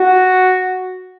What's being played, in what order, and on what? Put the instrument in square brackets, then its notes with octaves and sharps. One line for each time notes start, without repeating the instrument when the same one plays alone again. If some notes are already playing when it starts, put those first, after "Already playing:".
Already playing: [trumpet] F#4